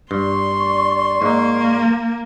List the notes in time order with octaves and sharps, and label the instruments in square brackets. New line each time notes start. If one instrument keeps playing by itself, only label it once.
[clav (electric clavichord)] G2 [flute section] D5 C#6 [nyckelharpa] C6
[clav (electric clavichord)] G#2 D#4 [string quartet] A#3